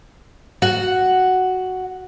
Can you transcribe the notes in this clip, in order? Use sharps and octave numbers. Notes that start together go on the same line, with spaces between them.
F#4 F#5